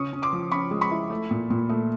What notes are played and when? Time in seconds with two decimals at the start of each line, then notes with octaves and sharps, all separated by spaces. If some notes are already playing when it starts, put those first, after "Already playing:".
Already playing: C#3 C#4 C#6 D#6
0.13 C#4
0.22 C6 D6
0.33 F3
0.51 C#4 B5 C#6
0.71 G#3
0.81 B5 C#6
0.91 E4
1.10 A3
1.31 A#2
1.50 A#2
1.69 A3